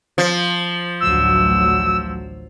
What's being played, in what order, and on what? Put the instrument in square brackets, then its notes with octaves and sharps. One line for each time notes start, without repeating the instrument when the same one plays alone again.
[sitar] F3
[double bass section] A1 D2 F#3 [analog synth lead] E6